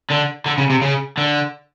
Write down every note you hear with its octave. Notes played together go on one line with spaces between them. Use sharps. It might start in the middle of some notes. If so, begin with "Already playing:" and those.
D3
D3
C#3
C3
C#3
D3